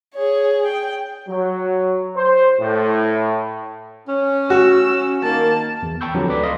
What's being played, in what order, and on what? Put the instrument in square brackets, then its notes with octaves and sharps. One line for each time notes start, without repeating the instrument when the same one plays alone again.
[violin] G#4 C#5
G5
[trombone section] F#3
C5
A2
[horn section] C#4
[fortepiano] F#4 [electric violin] E6
[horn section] D#3 A#3 [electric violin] A5
[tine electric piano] E2
G5 A5 B5 C#6 E6 G6
D3 F3 F#3 C4 G4 A#5
D2 A4 B4 D5 D6 B6
D#5 F5 C6